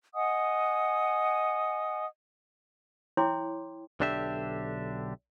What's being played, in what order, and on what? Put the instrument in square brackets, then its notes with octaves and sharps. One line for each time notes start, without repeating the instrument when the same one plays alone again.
[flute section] D#5 F#5 G#5 D#6
[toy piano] E4 C#5 G5 C6 D6
[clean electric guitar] B1 D3 D4 G4 E5